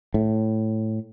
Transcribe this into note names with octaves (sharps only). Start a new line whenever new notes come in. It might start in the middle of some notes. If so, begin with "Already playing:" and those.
A2